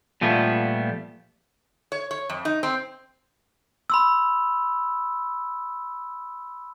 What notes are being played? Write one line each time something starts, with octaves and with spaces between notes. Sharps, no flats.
A#2 F3 G3 A3 B3
C#5
C#5
F2
D#4
C4
B5 C6 E6